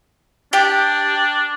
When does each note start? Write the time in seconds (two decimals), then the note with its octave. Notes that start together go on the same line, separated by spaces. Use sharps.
0.53 D4 G4